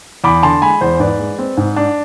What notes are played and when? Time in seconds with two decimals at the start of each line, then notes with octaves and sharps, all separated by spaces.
0.24 E2 B5 D6
0.43 D3 A5 C6
0.62 G#3 G#5 B5
0.81 E2 C5
1.00 G#2 B4 D5
1.19 G#3
1.39 C4
1.57 G#2
1.76 D4